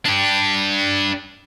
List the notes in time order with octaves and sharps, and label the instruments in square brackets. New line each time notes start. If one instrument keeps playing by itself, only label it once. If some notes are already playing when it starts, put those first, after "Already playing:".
[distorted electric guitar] D4 G4